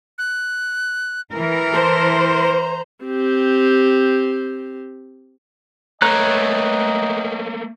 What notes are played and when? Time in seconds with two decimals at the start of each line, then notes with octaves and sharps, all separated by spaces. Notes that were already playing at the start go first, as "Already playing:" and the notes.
0.18 F#6
1.33 E3 A#4
1.73 C5 A5
2.44 A#5
3.04 C4 G4
6.02 A3 A#3 B4 C#5 D#5 G5 A#5 F#6